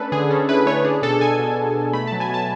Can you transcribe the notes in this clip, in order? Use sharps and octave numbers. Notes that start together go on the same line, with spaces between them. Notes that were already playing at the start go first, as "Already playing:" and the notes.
Already playing: A3 C#4 D4 A4 B4
D3 G#4
C#4 A4
E4 B4
A3 C#5
D4 G#4
B2 A4
B2 G#5
B2
B2
B2
A3 B5
F#3 A5
G#5
B2 A5